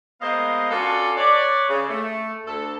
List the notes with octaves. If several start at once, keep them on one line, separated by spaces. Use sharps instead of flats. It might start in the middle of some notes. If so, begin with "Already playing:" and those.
G#3 A#3 B3 C5 D#5 F5
C#4 D4 F4 F#4 A4 D5
B4 C#5 D5
C#3
A3
D2 A4